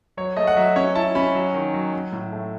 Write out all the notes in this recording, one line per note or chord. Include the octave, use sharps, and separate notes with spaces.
F#3 C#5
A3 D#5
F#5
F#3 E5
C#4 C#5
E4 A5
C#4 B5
F#3
D#3
F#3
F#3
A2
A3